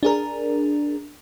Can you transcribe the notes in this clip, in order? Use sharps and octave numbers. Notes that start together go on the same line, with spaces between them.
D4 G#4 A#4